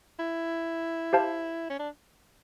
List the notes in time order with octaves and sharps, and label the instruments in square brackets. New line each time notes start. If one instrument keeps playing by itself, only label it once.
[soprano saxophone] E4
[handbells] G4 C5 F5 A5
[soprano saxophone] C#4
D4